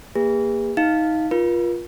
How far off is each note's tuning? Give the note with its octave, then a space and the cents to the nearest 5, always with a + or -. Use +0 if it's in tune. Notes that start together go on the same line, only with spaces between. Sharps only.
A#3 +0 G#4 -40 B4 -25
D#4 +20 F5 +0
F4 +0 A#4 +45